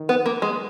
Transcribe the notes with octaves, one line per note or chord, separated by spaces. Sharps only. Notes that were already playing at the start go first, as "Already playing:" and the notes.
Already playing: D#3
B3
A#3
G#3